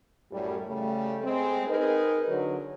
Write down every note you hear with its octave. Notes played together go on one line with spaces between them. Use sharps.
F#2 A2 G3
C#3 G3 A3
G#3 C4
D#4 G#4 A#4 B4 D#5
D3 F#3